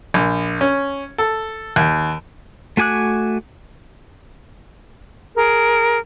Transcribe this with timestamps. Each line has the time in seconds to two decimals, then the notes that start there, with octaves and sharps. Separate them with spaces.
0.14 A#1
0.61 C#4
1.18 A4
1.76 D#2
2.77 A3 F#4 G#5 D6 F#6
5.34 G#4 A#4